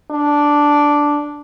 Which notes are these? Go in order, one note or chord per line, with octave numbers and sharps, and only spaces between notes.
D4